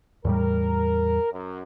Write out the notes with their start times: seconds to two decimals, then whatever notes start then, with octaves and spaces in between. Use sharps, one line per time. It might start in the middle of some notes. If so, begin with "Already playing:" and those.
0.25 E2 A2 G3 A#4
1.31 F#2